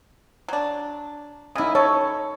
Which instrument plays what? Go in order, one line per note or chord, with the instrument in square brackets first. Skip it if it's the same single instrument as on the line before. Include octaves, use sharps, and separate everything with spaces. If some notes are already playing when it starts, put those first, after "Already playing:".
[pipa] F#3 D4
[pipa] C#3 E4 [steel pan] D#4 D#6
[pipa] A4 [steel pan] C#5